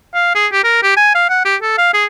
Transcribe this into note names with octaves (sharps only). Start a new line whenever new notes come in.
F5
G#4
G4
A#4
G4
G#5
F5
F#5
G4
A4
F5
G#4